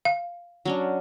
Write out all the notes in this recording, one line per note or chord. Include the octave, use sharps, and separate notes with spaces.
F5
F#3 C#4 D4